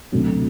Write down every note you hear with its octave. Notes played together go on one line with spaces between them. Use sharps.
D2 C3 F#3